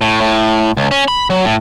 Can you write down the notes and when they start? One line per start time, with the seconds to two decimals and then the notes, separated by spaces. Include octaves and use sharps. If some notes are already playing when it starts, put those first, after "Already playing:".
0.01 A2
0.21 A2
0.77 C#2
0.91 C#4
1.08 B5
1.30 F#3
1.44 A2